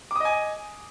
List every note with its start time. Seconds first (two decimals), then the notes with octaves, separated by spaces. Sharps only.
0.11 D6
0.16 D#6
0.20 D#5
0.25 G#5